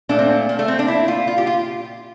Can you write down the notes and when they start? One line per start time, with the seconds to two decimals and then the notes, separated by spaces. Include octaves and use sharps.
0.09 A#2 A3 D4
0.19 C4
0.49 A#3
0.59 A3
0.68 C4
0.79 D4
0.88 E4
1.08 F4
1.27 F4
1.38 G4
1.47 F4